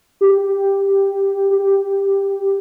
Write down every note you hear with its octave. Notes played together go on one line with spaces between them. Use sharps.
G4
G4